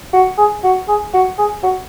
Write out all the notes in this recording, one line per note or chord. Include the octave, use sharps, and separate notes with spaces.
F#4
G#4
F#4
G#4
F#4
G#4
F#4